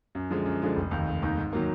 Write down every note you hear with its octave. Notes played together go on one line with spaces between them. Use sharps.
F#2
D3 F3 G#3
F#2
D3 F3 G#3
F1
D#2 D#3
F1
D#2 D#3
G#2
D#3 F#3 A#3